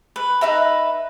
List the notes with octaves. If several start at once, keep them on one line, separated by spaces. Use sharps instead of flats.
B4
D#4 B4 E5 A#5